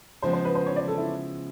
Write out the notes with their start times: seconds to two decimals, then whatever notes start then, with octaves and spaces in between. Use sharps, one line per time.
0.22 C#3 F3 G#3 B3 C5
0.33 C5
0.45 B4
0.55 C5
0.67 C#5
0.76 D5
0.88 A4
0.98 E4